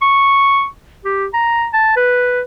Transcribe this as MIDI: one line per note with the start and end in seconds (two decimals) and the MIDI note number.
0.01 0.66 85
1.05 1.26 67
1.33 1.67 82
1.73 1.93 81
1.96 2.41 71